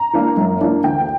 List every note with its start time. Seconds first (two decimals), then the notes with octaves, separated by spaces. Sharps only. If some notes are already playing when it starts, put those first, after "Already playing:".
Already playing: A#5
0.13 E3 A#3 D4
0.37 F#2
0.61 E3 A#3 D4
0.84 D2 G5